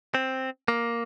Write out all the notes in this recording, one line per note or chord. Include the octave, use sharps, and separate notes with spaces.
C4
A#3